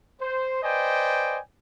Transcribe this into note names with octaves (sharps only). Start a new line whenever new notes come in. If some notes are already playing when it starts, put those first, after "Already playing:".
C5
B4 C5 D5 D#5 G5 G#5